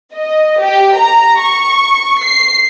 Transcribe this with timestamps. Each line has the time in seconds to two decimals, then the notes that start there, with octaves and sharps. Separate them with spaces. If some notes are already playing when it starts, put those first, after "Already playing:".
0.14 D#5
0.63 G4
0.98 A#5
1.42 C#6
2.24 C7